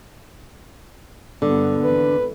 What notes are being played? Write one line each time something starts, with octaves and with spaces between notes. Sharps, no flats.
G2 D3 G3 B3
G#1 E3 B4